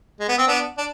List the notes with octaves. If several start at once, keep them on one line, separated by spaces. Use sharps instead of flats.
G#3
B3
C4
B3 D4
D4